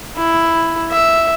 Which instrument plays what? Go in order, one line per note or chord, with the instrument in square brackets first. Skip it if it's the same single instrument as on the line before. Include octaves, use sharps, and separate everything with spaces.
[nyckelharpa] E4
E5